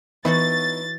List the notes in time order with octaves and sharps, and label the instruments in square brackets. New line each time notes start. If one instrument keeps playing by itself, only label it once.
[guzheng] E3 F#4 C#5 [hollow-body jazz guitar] B3 D#4 B4 [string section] A6